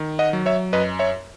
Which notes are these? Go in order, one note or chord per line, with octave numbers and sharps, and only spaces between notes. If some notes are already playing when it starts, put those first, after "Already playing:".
Already playing: D#3
D#5 F#5
F#3
C#5 E5
F#2 B4 D#5
C#5 E5